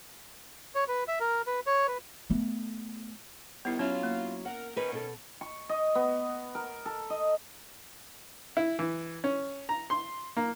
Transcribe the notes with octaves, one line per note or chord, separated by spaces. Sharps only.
C#5
B4
E5
A#4
B4
C#5
B4
A3 B3
C3 D#3 G3 B3 E4
F#3 C#4 E4 F4
A#3
A#4 F#5
D#3 C#4 A#4 B4
B2 A4
C#6
D#5
B3
A#4
A4
D#5
E4
E3
C#4
A#5
C6
A#3